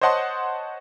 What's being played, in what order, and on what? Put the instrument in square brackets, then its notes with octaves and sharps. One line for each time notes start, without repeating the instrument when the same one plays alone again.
[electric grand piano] C5 C#5 D#5 F#5 A5 C6